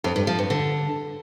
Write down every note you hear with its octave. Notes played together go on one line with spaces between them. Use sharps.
F2
G2
F3
G2
D3